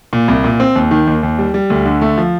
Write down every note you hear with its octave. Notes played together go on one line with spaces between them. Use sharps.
A#2
C2
A#2
C4
D#2
D#3
D#2
D#2
G3
G3
D2
D3
A3
F3